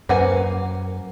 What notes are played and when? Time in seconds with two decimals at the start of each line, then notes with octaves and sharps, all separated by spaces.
0.09 F#2 A#3 B4 C5 F#5 G#5